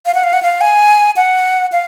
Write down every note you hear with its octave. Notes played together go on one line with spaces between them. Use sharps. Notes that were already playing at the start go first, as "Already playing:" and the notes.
F5
F#5
F5
F#5
F5
G#5
F#5
F5